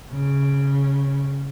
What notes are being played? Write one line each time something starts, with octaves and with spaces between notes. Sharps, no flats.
C#3